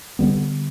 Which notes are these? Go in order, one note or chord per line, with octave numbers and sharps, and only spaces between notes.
D3 G3 B3